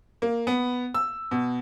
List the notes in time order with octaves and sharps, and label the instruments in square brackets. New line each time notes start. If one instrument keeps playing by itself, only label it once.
[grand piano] A#3
B3
E6
B2